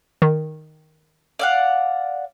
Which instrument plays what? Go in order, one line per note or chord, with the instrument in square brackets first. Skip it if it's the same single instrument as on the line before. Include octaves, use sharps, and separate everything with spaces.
[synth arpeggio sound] D#3
[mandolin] D5 F5 F#5